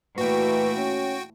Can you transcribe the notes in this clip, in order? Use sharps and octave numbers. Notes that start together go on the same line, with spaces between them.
A#2 E3 A3 F#4 B4 G5
C#4